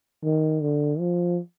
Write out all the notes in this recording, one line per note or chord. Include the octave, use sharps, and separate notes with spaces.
D#3
D3
F3